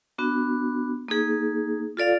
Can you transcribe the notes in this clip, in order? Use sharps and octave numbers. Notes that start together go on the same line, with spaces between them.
B3 D4 F#4
A#3 D#4 G#4
F4 A4 D5 F5